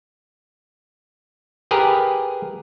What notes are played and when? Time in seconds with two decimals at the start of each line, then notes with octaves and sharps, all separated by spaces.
1.71 G4 G#4 A#4 B4